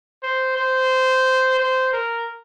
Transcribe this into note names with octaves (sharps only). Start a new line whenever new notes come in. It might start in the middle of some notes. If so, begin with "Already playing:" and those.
C5
C5
C5
A#4